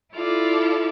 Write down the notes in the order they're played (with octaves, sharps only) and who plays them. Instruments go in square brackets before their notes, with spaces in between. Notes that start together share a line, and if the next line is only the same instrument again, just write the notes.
[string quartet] E4 F4 A4 D5